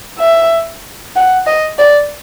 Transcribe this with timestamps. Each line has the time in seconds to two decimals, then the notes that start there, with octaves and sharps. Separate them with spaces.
0.19 E5
1.16 F#5
1.46 D#5
1.79 D5